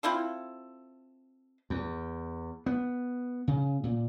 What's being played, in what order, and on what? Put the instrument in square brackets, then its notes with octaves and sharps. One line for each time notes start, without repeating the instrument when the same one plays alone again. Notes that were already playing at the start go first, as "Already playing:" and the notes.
[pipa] C4 E4 F4 A4
[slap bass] E2
B3
C#3
A#2